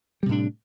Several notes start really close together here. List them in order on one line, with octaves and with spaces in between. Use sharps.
G3 C3 A2 D4